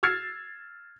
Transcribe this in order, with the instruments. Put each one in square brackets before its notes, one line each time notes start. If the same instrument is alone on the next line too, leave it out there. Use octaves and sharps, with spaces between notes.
[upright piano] E6 F6 G#6 A6 C7